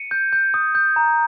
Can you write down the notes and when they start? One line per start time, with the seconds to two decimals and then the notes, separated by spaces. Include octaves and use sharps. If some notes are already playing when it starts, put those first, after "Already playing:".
Already playing: C#7 D#7
0.11 G6
0.33 G6
0.54 D#6
0.75 G6
0.96 A#5